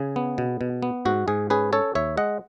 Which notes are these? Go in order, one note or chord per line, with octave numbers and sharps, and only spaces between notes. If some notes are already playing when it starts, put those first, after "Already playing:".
Already playing: C#3 G#4
B3
B2
B2
B3
G#2 F#4
G#2 G#4
C#4 G#4 B4
C#4 A4 C#5
D#2 C#5 E5
G#3 D#5 F#5